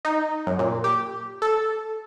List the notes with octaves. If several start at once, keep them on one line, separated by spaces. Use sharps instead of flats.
D#4
F#2
A#2
G4
A4